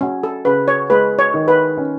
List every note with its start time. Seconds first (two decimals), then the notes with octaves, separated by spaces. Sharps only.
0.01 F#3 C#4
0.23 A4
0.45 C#3 B4
0.68 C#5
0.90 G#3 B4
1.19 C#5
1.34 D#3
1.48 B4
1.77 C#4